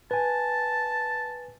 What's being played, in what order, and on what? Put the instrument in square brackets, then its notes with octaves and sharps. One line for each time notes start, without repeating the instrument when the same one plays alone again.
[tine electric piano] B4 G#5 [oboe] A5